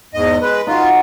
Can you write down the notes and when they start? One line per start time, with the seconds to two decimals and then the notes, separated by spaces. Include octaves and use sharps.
0.14 E2 G#2 D#5
0.42 G#3 B4
0.67 D#4 F4 F#4